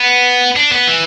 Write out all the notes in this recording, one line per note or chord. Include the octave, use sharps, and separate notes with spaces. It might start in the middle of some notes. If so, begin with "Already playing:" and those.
Already playing: B3
D4
B3
E3